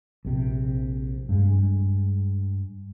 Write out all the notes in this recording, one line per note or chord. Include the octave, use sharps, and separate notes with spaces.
A#1 C3
G2 G#3